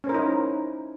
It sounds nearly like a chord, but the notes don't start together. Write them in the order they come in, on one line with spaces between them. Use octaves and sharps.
C#4 C5 A#4 E4 D#4